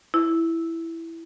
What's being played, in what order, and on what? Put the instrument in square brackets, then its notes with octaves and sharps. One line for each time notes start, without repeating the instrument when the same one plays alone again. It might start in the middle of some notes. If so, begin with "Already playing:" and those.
[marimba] E4